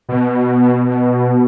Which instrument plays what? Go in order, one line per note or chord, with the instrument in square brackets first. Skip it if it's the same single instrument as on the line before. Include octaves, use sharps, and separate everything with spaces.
[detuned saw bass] B2